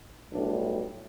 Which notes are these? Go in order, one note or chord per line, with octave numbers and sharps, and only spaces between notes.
B1 A2 G3 D4